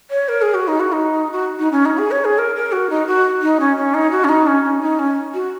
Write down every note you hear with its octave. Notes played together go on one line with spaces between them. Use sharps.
C#5
A#4
G#4
F#4
D#4
F#4
D#4
F#4
D#4
C#4
D#4
G#4
C#5
G#4
A#4
A#4
F#4
D#4
F#4
D#4
C#4
C#4
D#4
F#4
C#4
D#4
C#4
C#4
D#4
C#4
F#4